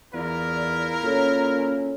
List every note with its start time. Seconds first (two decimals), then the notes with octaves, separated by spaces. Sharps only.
0.14 E2 E4 F4 A#4 D5
1.04 A#2 C#4 A4 C#5